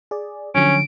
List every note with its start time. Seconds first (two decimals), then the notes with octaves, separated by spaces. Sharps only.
0.11 G#4 D5
0.55 D3 F3 F#3 C#4 D7